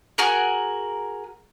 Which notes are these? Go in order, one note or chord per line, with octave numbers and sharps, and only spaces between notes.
F#4 G#4 A#4